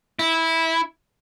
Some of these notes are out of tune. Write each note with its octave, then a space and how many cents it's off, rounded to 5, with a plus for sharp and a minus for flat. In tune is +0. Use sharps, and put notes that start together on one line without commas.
E4 -15